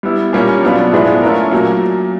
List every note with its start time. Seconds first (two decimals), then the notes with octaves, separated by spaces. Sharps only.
0.03 G3 B3 E4
0.33 A#2 G3 A#3 C#4
0.63 B2 F#3 B3 D4 F4
0.92 A2 F3 G#3 B3 D4
1.22 A3 C#4 F4 A#4
1.51 A#2 F#3 A#3